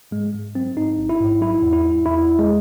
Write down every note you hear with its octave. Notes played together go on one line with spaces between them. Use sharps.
G#2 G#3
G#2
F#3 C4
G#2 D#4
A1
E4
G#2
F#3 E4
E2
E4
E2
E2 E4
E2
G#3